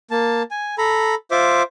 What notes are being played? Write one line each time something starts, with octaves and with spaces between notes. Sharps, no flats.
A#3 A5
G#5
A4 A#5 B5
F4 C5 E5 D6